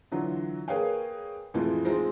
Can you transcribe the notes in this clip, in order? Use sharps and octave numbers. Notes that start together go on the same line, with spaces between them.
D3 E3 F#3 F4
A#3 G#4 B4 C#5 F5 G5
F2 A2 E3 G#3 A3 F4
G#3 C4 D#4 F4